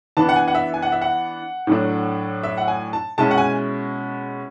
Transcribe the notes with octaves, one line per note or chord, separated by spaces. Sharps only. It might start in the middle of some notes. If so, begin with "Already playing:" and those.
E3 B3 D4 A5
F#5
G#5
F#5
E5
G#5
F#5
E5
F#5
A2 F#3 A3 D4
E5
F#5
G#5
A5
B2 G#3 C#4 E4 A5
F#5
G#5